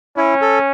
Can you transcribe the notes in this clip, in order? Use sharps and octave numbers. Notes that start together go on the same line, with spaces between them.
C#4 E4
A4